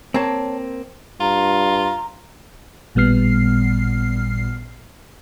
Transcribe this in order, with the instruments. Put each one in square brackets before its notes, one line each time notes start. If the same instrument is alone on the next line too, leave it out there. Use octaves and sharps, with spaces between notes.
[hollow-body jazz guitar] A#3 C4 [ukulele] C#5 A5
[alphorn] G2 [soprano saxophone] F4 [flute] A#5
[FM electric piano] A1 A#2 G3 B3 F6 C7